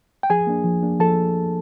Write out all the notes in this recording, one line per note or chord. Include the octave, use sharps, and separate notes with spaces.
G5
F3 G#4 G#5
A#3 D4
F3
A#3 D4
F3 A4 A5